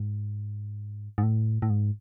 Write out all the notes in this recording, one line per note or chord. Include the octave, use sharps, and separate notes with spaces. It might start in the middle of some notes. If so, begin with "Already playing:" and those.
Already playing: G#2
G#2
A2
A2
G#2